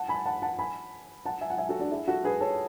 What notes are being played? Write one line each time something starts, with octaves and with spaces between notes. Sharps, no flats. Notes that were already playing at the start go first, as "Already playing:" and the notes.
Already playing: F#5 A5
G#5 B5
F#5 A5
F#5 A5
G#5 B5
F#5 A5
E5 G#5
F#5
E5 G#5
F#4 A4
D4 F#4
E4 G#4
F#4 A4
G#4 B4
A4 C#5